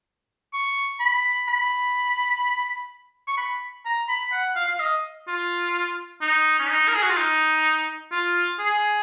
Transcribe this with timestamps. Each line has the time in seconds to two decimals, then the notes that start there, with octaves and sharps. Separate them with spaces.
0.53 C#6
1.00 B5
1.48 B5
3.27 C#6
3.37 B5
3.85 A#5
4.09 B5
4.32 F#5
4.55 F5
4.68 F5
4.80 D#5
5.27 F4
6.21 D#4
6.59 C#4
6.69 D#4
6.88 A#4
6.95 G#4
7.02 F#4
7.10 F4
7.17 D#4
8.12 F4
8.59 G#4